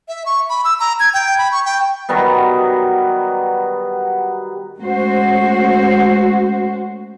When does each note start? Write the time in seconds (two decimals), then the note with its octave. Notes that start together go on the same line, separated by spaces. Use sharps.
0.08 E5
0.26 C#6
0.49 B5
0.64 E6
0.80 A#5
1.00 G#6
1.14 G5
1.38 B5
1.52 C#6
1.65 G5
2.09 D#3 F#3 G3 B3
4.80 G#3 A3 C#4 F#4 C5